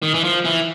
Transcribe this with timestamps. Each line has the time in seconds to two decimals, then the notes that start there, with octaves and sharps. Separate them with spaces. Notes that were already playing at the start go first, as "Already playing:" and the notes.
0.03 D#3
0.14 E3
0.24 F3
0.45 E3